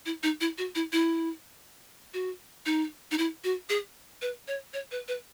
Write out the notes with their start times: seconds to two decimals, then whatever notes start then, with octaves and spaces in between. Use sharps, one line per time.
0.06 E4
0.23 D#4
0.41 E4
0.58 F#4
0.75 E4
0.93 E4
2.14 F#4
2.66 D#4
3.11 D#4
3.18 E4
3.44 F#4
3.69 G#4
4.22 B4
4.48 C#5
4.74 C#5
4.91 B4
5.08 B4